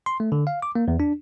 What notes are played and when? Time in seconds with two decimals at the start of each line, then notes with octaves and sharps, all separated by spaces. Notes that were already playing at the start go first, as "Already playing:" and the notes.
0.06 C6
0.20 A3
0.32 D3
0.47 F5
0.62 D6
0.75 A#3
0.88 E2
1.00 D4